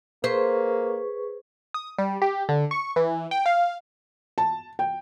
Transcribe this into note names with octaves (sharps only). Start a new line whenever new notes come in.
A#3 G#4 B4 C5 C#6
D#6
G3
G4
D3
C#6
E3
G5
F5
A5
G5